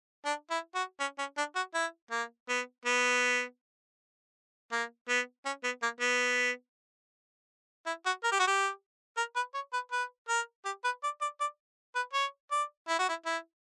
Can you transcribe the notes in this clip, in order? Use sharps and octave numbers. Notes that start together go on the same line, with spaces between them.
D4
E4
F#4
C#4
C#4
D4
F#4
E4
A#3
B3
B3
A#3
B3
C#4
B3
A#3
B3
E4
F#4
A#4
G4
F#4
G4
A#4
B4
C#5
B4
B4
A#4
G4
B4
D5
D5
D5
B4
C#5
D5
E4
F#4
E4
E4